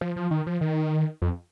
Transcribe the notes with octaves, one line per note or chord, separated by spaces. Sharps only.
F3
F3
D#3
F3
D#3
F2